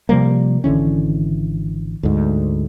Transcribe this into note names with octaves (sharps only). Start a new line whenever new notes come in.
C3 F3 G3 A#3
G#1 D3 E3 C#4
D2 G#2